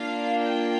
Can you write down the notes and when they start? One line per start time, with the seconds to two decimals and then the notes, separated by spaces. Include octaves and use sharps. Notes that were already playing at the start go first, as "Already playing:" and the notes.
Already playing: A#3 D4 F4 F5
0.43 G5